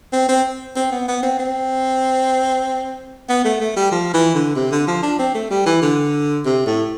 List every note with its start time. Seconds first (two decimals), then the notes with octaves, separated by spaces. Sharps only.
0.12 C4
0.29 C4
0.76 C4
0.92 B3
1.08 B3
1.23 C4
1.39 C4
3.29 B3
3.45 A3
3.60 A3
3.76 G3
3.92 F3
4.14 E3
4.35 D3
4.56 C3
4.72 D3
4.87 F3
5.03 D4
5.19 C4
5.35 A3
5.50 G3
5.66 E3
5.82 D3
6.45 C3
6.66 A2